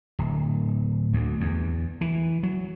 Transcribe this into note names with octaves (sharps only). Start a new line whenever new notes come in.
D1
D2
E2
E3
F#3